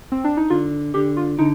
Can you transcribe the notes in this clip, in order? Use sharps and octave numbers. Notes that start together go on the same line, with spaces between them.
C4
D4
D#4
D3 F4
D3 G4
F4
D3 D#4